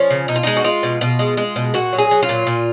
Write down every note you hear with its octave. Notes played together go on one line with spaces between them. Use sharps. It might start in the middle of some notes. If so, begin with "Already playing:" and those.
Already playing: F3 C#4
C#3
B2 D#4
F4
G#3 D#4
F#4
G#3 F4
B2
B2 F4
G#3
G#3
B2
A#2 F#4
F#3
G#4
F#3
F4
A#2
A#2